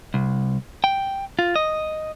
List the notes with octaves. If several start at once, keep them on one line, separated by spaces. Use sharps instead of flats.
C2
G5
F4
D#5